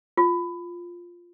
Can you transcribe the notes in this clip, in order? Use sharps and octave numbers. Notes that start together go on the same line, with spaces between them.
F4